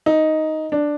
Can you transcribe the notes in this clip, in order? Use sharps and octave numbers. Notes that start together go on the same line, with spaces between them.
D#4
D4